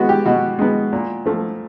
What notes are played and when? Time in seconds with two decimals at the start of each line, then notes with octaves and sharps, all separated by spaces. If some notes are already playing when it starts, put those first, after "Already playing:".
Already playing: G#3 B3 F#4
0.09 G4
0.26 B2 F#4
0.59 G#3 B3
0.93 A#2
1.26 F3 A3